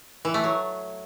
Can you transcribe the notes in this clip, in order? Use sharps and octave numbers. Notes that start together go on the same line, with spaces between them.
E3
A3
F#3